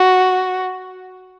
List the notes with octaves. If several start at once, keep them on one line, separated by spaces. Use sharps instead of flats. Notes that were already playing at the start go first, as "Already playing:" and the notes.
Already playing: F#4